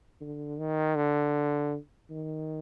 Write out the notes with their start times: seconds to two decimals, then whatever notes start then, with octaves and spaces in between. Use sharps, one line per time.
0.21 D3
0.59 D#3
0.97 D3
2.10 D#3